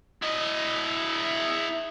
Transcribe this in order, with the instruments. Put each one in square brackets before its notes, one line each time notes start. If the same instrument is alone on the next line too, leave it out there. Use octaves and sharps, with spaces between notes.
[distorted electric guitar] E4 D#5